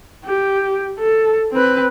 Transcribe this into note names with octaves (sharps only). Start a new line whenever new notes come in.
G4
A4
C4 B4